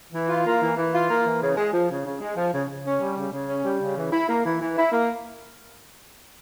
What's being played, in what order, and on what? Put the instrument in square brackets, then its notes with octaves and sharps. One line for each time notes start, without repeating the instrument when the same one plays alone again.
[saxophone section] E3
F4
A#3
E3
E3
F4
A#3
E3
C#3
G#3
F3
C#3
C#3
G#3
F3
C#3
C#3
C#4
G3
C#3
C#3
C#4
G3
C#3
E3
E4
A#3
E3
E3
E4
A#3